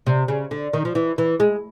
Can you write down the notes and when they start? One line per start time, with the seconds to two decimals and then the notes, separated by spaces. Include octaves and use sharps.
0.07 C3
0.28 C#3
0.51 D3
0.73 D#3
0.85 F3
0.95 E3
1.18 E3
1.40 G#3